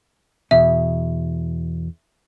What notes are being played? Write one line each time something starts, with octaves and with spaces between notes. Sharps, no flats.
E2 B2 E5